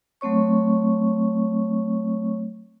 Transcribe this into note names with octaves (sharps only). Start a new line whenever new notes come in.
F#3 A3 C4 C#5 C#6